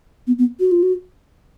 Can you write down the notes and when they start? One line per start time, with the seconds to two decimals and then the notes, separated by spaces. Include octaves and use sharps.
0.27 B3
0.39 B3
0.60 F#4
0.72 F4
0.83 F#4